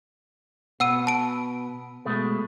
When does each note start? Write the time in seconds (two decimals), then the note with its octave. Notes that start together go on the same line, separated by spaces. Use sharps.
0.80 B2 B3 F#5 E6 D#7
1.07 A5 D7
2.05 B2 G#3 A3